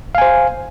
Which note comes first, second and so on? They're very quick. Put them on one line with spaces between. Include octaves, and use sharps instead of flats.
F5 G#5 C5